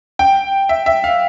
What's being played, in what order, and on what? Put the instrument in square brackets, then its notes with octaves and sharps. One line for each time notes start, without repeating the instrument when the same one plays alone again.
[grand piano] G5
E5
E5
F5